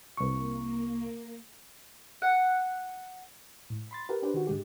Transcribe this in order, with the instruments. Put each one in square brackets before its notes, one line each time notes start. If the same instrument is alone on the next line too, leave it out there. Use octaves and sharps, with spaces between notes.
[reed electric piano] C2 C#6 [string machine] A#3
[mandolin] F#5
[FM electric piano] A2
B5 C6 A6
G4 A#4 B4
D4 G4 B4 C5
D#3 F#4
G#2 D3 G#3 G4